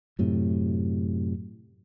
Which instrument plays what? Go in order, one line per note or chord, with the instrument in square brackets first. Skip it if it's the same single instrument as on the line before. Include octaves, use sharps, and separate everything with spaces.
[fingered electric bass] F#2 A2 C3